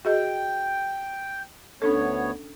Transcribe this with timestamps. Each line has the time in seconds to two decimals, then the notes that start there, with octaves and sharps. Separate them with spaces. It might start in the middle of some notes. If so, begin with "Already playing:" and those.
0.05 F#4 G#4 D#5 G5
1.82 D2 B3 C#4 D4 A4 C#5